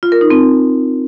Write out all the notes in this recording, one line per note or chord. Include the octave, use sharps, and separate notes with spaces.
F4
A#4
D#4
C4